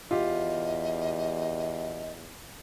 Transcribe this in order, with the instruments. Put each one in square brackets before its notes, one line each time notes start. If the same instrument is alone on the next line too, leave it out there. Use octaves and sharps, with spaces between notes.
[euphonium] E2 [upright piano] F4 G4 [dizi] D#5